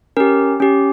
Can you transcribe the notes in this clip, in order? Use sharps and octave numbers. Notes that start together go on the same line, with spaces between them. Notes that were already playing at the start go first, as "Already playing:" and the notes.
C#4 G4 A#4
C#4 G4